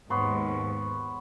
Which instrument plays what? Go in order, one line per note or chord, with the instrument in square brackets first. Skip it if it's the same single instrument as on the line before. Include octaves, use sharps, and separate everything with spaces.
[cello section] D#2 G#2 [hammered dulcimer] B3 C#5 C6